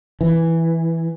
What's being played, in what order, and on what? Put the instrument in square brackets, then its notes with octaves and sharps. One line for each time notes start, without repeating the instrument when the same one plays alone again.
[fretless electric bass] E3